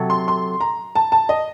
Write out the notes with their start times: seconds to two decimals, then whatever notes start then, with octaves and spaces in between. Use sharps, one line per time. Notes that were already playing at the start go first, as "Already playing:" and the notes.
Already playing: C3 F#3 A4
0.10 C6
0.28 C6
0.61 A#5
0.95 A5
1.12 A5
1.29 D#5